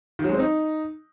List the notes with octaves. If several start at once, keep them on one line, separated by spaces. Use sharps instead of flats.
D#3
F#3
G#3
C4
D#4